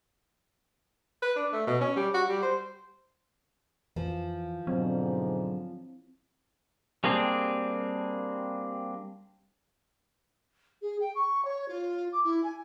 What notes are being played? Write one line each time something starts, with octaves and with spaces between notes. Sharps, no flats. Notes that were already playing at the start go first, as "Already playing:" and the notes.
B4
D4
A3
B2
C#4
G3
F#4
G3
C5
F2 E3 F3
G#2 B2 D3 F#3 C4
G3 A#3 C4 D4 G#4
G#4
G5
C#6
C#5
F4
D6
E4
G#5